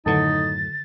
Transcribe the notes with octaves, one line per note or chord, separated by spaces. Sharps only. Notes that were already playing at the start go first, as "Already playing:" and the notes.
F#2 A2 D3 D#3 D#4 F#5 A6